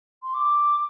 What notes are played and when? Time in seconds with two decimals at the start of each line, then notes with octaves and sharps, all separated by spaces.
0.23 C6
0.34 D6